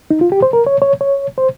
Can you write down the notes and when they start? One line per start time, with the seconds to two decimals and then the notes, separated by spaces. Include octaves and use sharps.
0.11 D#4
0.21 F4
0.32 G4
0.42 C5
0.53 A#4
0.67 C#5
0.82 C#5
1.01 C#5
1.38 C5